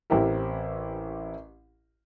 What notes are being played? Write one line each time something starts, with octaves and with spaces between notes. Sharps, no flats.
A1 C4 E4 G4 A#4